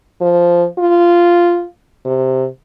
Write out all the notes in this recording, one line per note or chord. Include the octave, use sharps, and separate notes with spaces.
F3
F4
C3